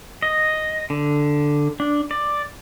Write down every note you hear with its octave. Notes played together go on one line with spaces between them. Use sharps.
D#5
D3
D4
D5